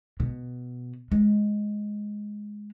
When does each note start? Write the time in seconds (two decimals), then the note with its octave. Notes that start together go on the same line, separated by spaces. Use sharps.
0.20 B2
1.12 G#3